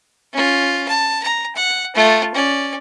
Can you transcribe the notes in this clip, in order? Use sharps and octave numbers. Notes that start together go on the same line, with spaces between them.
C#4 F4
A5
A#5
F#5
A3 F4
C#4 D5